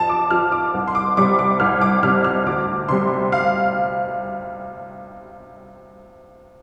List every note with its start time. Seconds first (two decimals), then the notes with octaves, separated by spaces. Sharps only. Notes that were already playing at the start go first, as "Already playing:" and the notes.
Already playing: F2 F3 A5
0.09 D6
0.31 F3 F6
0.52 D6
0.74 C2
0.88 C6
0.95 D6
1.17 C3 G3 D6
1.39 D6
1.60 C2 F6
1.82 D6
2.03 C3 G3 F6
2.24 F6
2.46 D2 D6
2.89 C3 G3 C6
3.32 F5